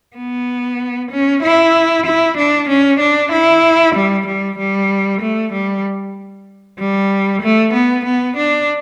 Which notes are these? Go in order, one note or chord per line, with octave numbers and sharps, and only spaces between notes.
B3
C#4
E4
E4
D4
C#4
D4
E4
G3
G3
G3
A3
G3
G3
A3
B3
B3
D4